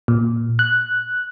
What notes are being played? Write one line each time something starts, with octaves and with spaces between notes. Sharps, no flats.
A#2
F#6